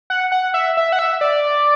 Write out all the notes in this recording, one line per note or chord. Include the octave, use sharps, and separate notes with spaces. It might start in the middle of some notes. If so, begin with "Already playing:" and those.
F#5
F#5
E5
E5
F#5
E5
D5